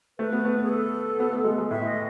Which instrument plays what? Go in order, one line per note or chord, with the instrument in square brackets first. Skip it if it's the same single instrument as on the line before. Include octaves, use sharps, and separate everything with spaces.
[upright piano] A3 [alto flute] B4
[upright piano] B3
A3
[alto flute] G#4
A4
[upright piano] B3
A3
G#3
G#3
[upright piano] A2 [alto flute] E5
[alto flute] D#5